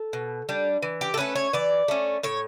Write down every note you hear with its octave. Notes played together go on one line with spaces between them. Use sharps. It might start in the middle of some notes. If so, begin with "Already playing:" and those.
Already playing: A4
B2
G3 D4
E3
G4
A4
A3 C#4 B4
C#5
E3 D5
A3 C#4
A2 C#5